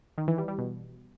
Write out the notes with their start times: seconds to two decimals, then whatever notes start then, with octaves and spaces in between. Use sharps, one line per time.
0.18 D#3
0.28 E3
0.38 G3
0.48 G3
0.58 B2